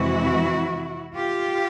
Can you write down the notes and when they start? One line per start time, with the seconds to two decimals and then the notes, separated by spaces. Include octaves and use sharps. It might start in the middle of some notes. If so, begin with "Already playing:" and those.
Already playing: F2 C3 E3 G#3 E4 F#4
1.14 F4 G4